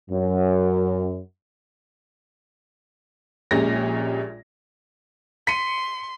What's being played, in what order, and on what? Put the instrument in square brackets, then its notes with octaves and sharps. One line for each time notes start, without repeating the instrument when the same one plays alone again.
[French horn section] F#2
[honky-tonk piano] A#1 A#2 G#3 C#4 G4 A#6
[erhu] C6 [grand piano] B6 C#7 D#7